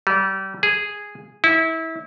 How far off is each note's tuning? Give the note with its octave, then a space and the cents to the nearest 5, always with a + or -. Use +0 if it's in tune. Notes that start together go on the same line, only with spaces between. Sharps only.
G3 -30
G#4 -5
E4 -25